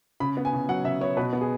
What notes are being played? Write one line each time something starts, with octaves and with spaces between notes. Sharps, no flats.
C#3 B5
B3
G#5
C#3
F#3 F#5
C#3 E5
B3 C#5
B2 B4
B3
G#4